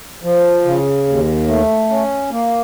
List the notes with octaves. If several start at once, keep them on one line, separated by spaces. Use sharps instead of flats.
F3
C#3
D#2
A3
C#4
A#3